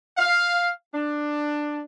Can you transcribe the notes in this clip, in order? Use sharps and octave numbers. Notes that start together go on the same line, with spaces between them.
F5
D4